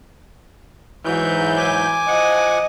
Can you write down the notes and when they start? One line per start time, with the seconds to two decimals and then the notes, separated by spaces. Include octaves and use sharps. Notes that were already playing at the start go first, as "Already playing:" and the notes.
1.05 G#2 E3 F#3 G6
1.57 G#5 D6
2.08 F3 D#5 F#5